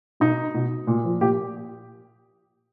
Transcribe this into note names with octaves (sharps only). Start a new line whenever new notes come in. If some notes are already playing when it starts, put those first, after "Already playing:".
B2 D#4
B2
A#2
F3
A#2 G4